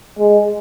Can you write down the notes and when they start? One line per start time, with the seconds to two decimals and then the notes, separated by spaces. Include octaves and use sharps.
0.19 G#3